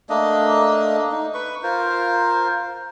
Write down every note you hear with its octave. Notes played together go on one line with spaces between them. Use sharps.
A3 A#3 D4 D#5
D#4
B4 C#6
F4 A#4 C5